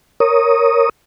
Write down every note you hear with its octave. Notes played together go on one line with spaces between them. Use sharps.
A#4 C#5 D#6